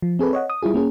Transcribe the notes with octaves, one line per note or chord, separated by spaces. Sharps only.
F3
C4 G#4 A4 B4
C#5 D#5 F#5
D#6
G3 E4 F4 G#4
A#3 C#4 G#4